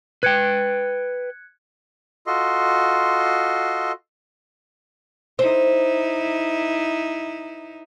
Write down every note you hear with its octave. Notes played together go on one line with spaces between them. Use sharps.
B4 G5 F#6 G#6 C#7
F4 F#4 A4 D#5 C6
D#4 E4 C5